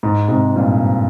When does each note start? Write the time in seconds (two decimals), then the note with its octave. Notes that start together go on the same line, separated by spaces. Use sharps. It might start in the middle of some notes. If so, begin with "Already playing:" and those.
0.03 G#2
0.29 G#2 C3
0.56 G2 A#2